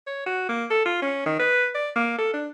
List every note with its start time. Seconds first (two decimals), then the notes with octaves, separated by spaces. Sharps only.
0.07 C#5
0.26 F#4
0.49 A#3
0.70 A4
0.85 F4
1.02 C#4
1.26 D#3
1.39 B4
1.75 D5
1.96 A#3
2.18 A4
2.33 D4